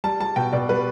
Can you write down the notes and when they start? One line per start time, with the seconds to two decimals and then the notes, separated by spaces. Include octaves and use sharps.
0.04 G3 A5
0.20 G3 A5
0.36 B2 G5
0.53 B2 D5
0.69 G3 B4